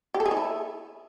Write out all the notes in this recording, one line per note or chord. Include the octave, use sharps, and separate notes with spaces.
G4
A4
G#4
D#4
E4